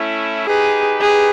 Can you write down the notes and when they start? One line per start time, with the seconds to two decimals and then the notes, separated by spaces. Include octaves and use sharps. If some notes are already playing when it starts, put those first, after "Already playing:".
Already playing: A3 C#4 E4
0.47 D#4 G4 G#4 B4
1.01 G#4